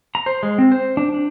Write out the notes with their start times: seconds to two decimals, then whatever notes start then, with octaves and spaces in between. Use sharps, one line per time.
0.15 A#5
0.26 C5
0.43 G#3
0.58 C4
0.72 C5
0.97 D4
1.14 D4